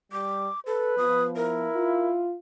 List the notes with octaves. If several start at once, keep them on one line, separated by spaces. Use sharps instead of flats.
G3 D6
A4 B4
F3 B3 D#6
E4 A#4
F4